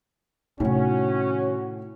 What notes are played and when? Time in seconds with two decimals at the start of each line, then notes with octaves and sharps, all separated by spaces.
0.60 A2 C3 D#3 C#4 F#4